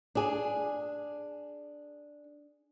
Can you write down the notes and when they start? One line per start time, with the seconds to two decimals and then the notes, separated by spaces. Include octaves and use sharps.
0.15 D4 G#4